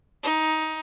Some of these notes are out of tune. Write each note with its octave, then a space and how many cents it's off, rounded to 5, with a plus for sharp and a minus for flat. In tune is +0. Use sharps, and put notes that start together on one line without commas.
D#4 +15